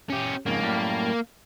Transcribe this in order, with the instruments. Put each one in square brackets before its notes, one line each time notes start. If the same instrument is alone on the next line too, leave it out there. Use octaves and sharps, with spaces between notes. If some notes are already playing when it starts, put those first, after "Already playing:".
[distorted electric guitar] C#4 G4
[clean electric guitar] F2 G#2 C#3 [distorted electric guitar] A#3
[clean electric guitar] F#2 A2 G3